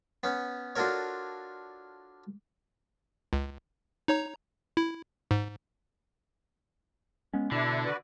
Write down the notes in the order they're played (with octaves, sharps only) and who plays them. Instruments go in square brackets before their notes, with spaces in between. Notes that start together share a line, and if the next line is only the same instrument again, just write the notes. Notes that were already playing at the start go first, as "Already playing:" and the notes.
[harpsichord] B3 C#4
D4 F4 F#4 A4 A#4 C#5
[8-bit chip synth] C#2
D#4 C#5 A#5
E4
G#2
[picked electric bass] G#3 B3 C#4
[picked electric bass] B2 [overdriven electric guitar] D3 [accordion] D4 E4
[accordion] F#4 B4 D5